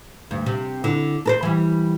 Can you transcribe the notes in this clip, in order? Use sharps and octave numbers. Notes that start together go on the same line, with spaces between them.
D2 G2
C3
D3 E4
A4 A#4 C5
E3 G3